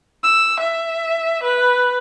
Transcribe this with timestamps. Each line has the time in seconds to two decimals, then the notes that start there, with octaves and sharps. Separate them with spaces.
0.23 E6
0.60 E5
1.43 B4